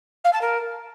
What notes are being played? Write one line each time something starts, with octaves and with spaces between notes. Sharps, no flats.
F5
A5
A#4